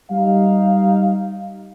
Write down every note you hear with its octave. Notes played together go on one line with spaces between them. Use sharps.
G3 D#4 F5